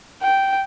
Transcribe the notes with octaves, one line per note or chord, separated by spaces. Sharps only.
G5